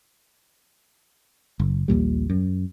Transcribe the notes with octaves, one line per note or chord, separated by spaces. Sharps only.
F#1
A#1 D#2 A#2 G3
F#2